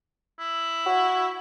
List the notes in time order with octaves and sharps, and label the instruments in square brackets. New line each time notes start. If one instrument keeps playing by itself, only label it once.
[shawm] E4
[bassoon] F#4